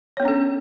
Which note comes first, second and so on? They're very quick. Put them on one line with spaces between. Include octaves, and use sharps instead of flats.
C#5 B3 D4 C#4 A4